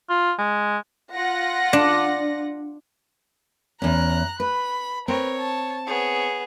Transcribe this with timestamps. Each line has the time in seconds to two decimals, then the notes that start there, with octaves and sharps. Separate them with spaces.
0.10 F4
0.38 G#3
1.12 F4 F#5 A#6
1.73 D4
3.82 E2 C#4 A#5 F#6
4.40 B4 B5
5.08 C4 A#4 B4 C#5
5.38 A5
5.87 B3 G#4 C#5